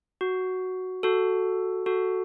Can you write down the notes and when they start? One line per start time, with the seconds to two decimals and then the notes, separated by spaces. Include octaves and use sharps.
0.21 F#4
1.03 F#4 A4
1.86 F#4 A4